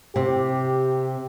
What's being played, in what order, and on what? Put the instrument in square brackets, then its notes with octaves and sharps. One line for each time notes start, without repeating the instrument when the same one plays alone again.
[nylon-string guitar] C3 [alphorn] G4